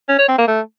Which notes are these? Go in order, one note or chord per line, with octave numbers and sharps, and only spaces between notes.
C#4
C#5
C4
A#3
A3